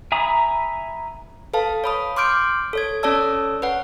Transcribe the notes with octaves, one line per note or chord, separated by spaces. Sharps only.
E5 G#5 A#5 B5 D#6
A4 B4 F5 A5
C#5 B5 D#6
C6 D6 F6 G6 D7
A4 C#5 G#6
C#4 A4 C#5 D5 A5 E6
B4 C#5 F#5